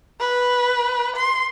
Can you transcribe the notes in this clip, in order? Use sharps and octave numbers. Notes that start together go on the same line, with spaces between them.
B4
C6